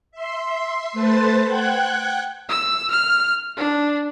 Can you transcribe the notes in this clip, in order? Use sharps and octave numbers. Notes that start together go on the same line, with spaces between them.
E5 C6
A3 B4 C5 A5 C6 A6
F#5 G5 F#6 G#6
E6
F6
D4